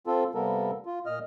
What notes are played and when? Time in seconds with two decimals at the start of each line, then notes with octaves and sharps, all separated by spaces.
0.07 C4 F4 A4
0.34 C3 G3 A#3 B3 A4 A#4
0.86 F4
1.06 A#2 D#5 F6